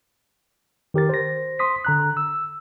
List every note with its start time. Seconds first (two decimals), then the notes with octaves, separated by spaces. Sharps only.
0.94 D#3 G4 A#4 A6
1.09 C5 A#6
1.59 C6 D#6 B6
1.85 D3 A#5 F#6
2.17 E6